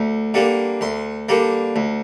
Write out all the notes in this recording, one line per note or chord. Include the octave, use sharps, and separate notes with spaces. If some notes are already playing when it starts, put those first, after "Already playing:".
Already playing: D2
D3 G3 A#3
D2 C6
D3 G3 A#3
D2